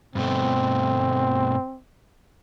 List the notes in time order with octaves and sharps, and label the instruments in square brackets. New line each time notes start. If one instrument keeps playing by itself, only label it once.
[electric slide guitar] G2 B2 A3 [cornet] C4